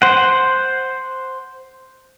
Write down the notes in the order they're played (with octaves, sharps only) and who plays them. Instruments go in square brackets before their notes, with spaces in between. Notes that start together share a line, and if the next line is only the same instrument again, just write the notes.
[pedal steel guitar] C5 F#5